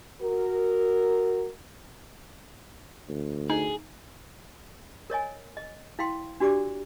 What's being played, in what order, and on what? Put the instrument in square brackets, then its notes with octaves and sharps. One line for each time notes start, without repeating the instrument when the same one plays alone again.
[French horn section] F#4 A#4
[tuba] D2
[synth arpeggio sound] D#4 [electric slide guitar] G#4
[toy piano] A#4 C#5 D#5 G#5
D#5
E4 F5 G5 C6
D4 F#4 G4 D5 D6